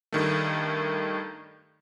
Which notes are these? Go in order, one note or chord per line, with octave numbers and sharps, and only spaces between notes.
G2 D#3 A3